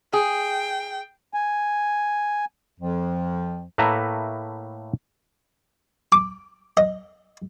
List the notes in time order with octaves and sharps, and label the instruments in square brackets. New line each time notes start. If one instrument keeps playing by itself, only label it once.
[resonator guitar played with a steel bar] G#4 [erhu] G5
[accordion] G#5
[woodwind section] F2 F3
[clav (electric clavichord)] A2 A3 A#3 B4 E5 A#5
[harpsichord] D6
D#5